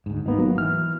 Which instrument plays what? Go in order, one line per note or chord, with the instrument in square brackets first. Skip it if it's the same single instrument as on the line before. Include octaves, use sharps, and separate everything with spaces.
[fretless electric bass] D2 G#2
[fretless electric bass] G#1 A#3 [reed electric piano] B3 D#4
[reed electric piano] F#3
[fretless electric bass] E3 [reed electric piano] F6